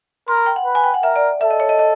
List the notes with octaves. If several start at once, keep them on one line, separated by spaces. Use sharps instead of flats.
A#4 C6
B5
G5
F#5
B4
G#5
G5
F#5
A#4 E5
D5
A4 E5
D#5
C#5
D#5
D#5